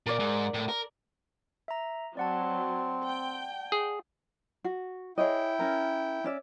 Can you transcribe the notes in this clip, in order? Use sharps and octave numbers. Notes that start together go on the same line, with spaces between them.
A#2 A#4 D5
G#2
A2
A#4
E5 A#5
F#3 C4 D5 F#5 A5
G5
G#4
F#4
E4 G#4 C#5 D#5 G5
C#4 A#4
C#4 D5 E5